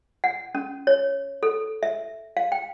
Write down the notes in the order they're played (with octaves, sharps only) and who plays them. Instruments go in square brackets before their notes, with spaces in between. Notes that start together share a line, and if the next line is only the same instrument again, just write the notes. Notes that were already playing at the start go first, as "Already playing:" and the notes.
[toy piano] F#5
C#4
C#5
A4
E5
F5
G5